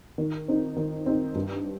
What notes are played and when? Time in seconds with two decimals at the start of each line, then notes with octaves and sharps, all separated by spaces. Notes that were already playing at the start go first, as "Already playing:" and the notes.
0.18 D#3
0.48 C4 D#4
0.76 D#3
1.06 C4 D#4
1.35 G2